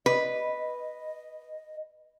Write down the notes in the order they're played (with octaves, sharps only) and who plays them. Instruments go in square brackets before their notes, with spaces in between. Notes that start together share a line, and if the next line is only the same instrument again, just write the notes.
[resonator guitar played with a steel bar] B4 [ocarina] D#5